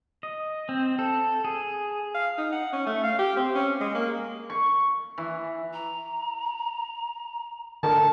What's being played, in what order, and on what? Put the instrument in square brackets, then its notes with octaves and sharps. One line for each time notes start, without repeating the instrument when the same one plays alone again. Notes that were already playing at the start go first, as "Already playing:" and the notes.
[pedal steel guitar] D#5
C4
A4
G#4
[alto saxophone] F5
D#4
F#5
C#4
A3
F5
G4
C4
C#4
G#3
A#3
[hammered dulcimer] C#6
E3
[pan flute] A#5
[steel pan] D3 A#4 [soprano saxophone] A5